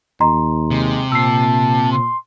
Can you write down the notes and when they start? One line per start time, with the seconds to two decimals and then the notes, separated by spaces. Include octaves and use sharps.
0.20 D#2 D#5 A#5 C6
0.71 C3 G#3
1.12 A#2 A5 E6 C7
1.92 C6